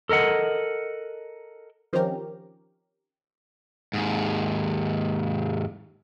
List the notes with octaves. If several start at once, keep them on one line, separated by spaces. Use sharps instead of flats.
A4 A#4 D#5 F#5
D#3 F3 C4 C#4 G4 A#4
D#2 G#2